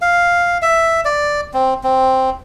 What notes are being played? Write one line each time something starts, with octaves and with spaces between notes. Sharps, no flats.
F5
E5
D5
C4
C4